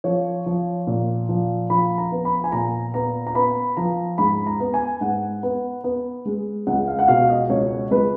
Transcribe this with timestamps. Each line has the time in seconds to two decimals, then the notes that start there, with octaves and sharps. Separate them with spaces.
0.04 F3 C#5
0.46 F3
0.87 A#2
1.29 F3
1.70 F3 B5
1.98 A#5
2.12 B3
2.25 B5
2.44 G#5
2.52 A#2 A#5
2.94 B3 A#5
3.27 A#5
3.35 B3 B5
3.77 F3 A#5
4.18 G#2 B5
4.46 A#5
4.60 B3
4.74 G#5
5.01 G#2 F#5
5.43 B3
5.84 B3
6.26 G#3
6.67 C#2 F#5
6.88 F5
6.99 F#5
7.08 B2 F5
7.29 D#5
7.50 C#2 C#5
7.91 C#2 B4